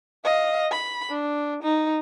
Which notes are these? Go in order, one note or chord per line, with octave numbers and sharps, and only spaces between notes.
D#5 F5
B5
D4
D#4